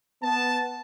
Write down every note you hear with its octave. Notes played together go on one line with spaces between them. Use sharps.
B3 A5